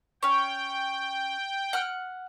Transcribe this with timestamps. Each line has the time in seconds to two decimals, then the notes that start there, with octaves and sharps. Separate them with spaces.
0.23 C#4 C#5 G5
1.73 F#5 F6